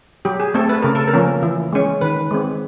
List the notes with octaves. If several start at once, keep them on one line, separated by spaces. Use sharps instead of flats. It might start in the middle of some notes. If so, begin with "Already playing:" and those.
F#3 G4
G#4
A3 C4 A4
B4
C#3 A#4
A4
A#4
F3 A#3 C#4
E3
G#3 C#4
D#3 B4
G#3 C4